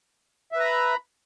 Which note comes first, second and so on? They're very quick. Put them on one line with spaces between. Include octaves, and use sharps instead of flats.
E5 B4 A#5 B5